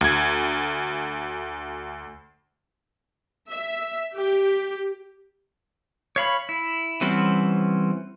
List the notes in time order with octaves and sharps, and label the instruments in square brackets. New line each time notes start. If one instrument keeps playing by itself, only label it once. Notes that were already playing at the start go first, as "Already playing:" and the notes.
[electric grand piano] D2 G#6
[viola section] E5
G4
[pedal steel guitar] C#5 F5 B5
E4
E3 G3 C4 C#4 F#5